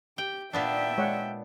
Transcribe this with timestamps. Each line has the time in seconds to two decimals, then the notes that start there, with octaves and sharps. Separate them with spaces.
0.18 G4 G5
0.53 A#2 B3 D4 E5 G5
0.98 G#3 C#5 F#5